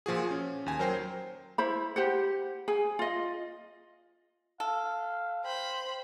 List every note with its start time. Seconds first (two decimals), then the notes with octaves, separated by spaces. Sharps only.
0.06 A#2 F3 F#4 G#4
0.31 C#4
0.66 D#2 G#5
0.79 F#3 A#4 C5 G5 C7
1.58 E4 C5 B5
1.96 G4 C5 F#5
2.68 G#4 G#5
2.99 F4 D#5
4.60 A4 F5
5.44 C5 G5 B5